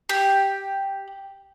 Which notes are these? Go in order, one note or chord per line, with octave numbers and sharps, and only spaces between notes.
G4